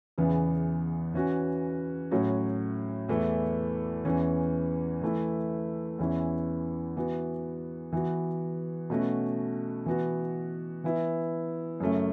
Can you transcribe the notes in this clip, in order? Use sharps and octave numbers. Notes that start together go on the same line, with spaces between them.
E2 C#3 E3 B3
E3 C#4 F#4
A2 F#3 C#4 F#4
E2 E3 A3 E4
E2 E3 C#4
E3 A3 E4
E2 E3 C#4 E4
E3 B3 F#4
E3 B3 F#4
B2 A3 C#4 F#4
E3 B3 F#4
E3 B3 E4
F#2 C#3 A3 C#4